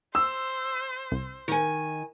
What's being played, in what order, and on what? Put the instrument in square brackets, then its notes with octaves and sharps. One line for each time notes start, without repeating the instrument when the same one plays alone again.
[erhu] C5 [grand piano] E6
[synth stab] C2
[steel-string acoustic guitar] D#3 G#5